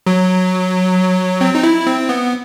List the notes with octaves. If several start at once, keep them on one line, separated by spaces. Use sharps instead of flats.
F#3
C4
D#4
E4
C4
B3